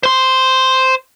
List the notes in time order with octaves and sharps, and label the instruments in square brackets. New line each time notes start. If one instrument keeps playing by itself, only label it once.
[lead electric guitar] C5 C6